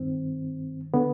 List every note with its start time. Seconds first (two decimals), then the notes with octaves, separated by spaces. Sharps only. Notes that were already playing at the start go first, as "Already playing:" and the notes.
Already playing: G2 D#3 C4
0.94 D3 B3